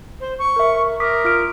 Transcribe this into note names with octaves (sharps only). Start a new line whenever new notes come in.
C5
C#6
A#4 E5
A#4 D6 D#6 B6
F4 F6 D7